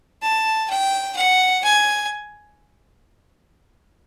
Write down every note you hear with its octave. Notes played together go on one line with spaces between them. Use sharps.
A5
G5
F#5
G#5